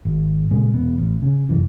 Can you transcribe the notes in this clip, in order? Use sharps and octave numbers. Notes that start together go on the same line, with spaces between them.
G#1
A#2 C#3 G#3
E1 B3
A1
C#3
F1 F#2 E3